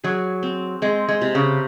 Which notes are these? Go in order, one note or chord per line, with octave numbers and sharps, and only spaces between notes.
F#3 G#4
C4
G#3 C4
G#3
C3
C#3